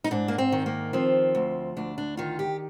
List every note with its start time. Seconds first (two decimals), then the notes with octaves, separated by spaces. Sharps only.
0.04 D#4
0.11 G#2 D4
0.28 A#3
0.38 C4
0.52 D#3
0.66 A#3
0.93 F3 C4
1.35 D2
1.77 D2 D4
1.98 D4
2.17 D#3 F4
2.39 G4